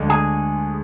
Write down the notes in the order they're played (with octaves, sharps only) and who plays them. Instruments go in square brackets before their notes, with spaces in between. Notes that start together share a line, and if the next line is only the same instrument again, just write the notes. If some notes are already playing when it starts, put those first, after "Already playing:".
Already playing: [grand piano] D2 D3 G#3 D4
[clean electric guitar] G#4